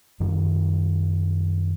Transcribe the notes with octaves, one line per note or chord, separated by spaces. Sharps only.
F#2 D#3 G3